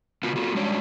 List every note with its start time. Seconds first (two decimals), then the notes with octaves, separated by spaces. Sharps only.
0.23 C#3 B3 F4 F#4
0.36 B3 F4 F#4 A4
0.55 G3 G#3 C#4 D4 F#4 C#5